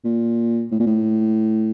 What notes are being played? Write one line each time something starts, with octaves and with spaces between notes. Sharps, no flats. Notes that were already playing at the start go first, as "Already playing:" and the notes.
A#2
A2
A#2
A2